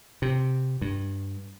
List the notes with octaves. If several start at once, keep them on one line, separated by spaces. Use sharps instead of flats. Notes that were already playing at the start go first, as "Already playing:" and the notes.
C3
G2